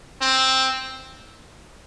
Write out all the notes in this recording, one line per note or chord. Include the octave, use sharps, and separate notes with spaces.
C4